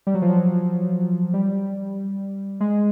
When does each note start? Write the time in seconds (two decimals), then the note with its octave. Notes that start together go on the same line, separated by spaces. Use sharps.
0.07 G3
0.14 F#3
0.22 F3
0.29 F#3
1.34 G3
2.60 G#3